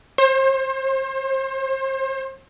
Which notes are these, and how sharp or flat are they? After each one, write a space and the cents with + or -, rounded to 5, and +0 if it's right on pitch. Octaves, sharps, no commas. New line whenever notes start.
C5 +35